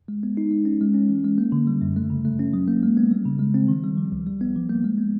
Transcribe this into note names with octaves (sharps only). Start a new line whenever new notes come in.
G#3
B3
D#4
G#3
C#4
G#3
C#4
E3
G#3
A#3
D3
G3
F#2
A3
C#3
A3
C#4
F#3
A#3
G#3
B3
G3
C#3
G#3
C4
D#3
G3
F3
C#2
G3
B3
F3
A#3
G#3
B3